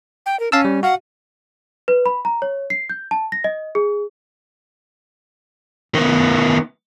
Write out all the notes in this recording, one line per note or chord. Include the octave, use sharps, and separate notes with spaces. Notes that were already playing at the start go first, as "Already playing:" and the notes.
G5
A#4
C#4 F5 A5 E6
G3
F#4 F5 F#5
B4
B5
A#5
C#5
C7
G6
A5
A#6
D#5
G#4
D#3 B3